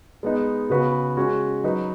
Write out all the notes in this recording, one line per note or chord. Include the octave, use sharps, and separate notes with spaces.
G#3 B3 D#4
C#3 B3 F#4 B4
G#3 C#4 F#4
F#3 D#4 B4